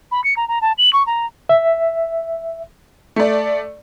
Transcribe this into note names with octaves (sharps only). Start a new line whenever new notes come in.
B5
C#7
A#5
A#5
A5
F#7
C#6
A#5
E5
A3 D5